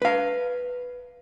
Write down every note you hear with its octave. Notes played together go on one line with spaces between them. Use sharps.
B4 F5